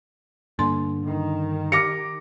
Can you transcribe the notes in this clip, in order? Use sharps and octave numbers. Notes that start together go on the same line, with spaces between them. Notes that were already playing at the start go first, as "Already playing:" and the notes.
G2 D3 A#3 C6
D#3
G4 D6 A#6 C#7